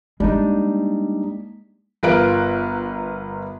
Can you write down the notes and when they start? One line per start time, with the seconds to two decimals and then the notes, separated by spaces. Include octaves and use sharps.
0.20 G3 G#3 A#3 D4 D#4
2.03 G1 F4 A#4 B4 F#6 D7